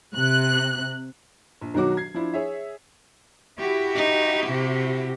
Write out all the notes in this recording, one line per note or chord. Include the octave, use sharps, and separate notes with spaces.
C3 F#6
A#1
B1 D#3 F#3 F#4 D6
G#6 C7
F3 D4 E4
G#4 C#5 E5
E4 F#4 G4
D#4
C3